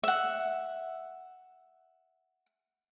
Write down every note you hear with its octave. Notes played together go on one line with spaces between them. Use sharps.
E5 F#5